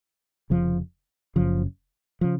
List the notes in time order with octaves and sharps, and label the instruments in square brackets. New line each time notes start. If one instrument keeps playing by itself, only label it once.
[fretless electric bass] F1 F2 C#3 F3
F#1 F#2 C#3 F3
C#3 F3